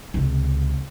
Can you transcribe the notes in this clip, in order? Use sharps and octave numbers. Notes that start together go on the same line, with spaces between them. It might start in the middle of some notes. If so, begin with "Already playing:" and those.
C#2 C3